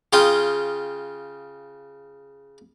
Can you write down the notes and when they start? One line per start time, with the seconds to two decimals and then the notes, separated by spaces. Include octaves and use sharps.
0.13 C#3 F4 G5 D#6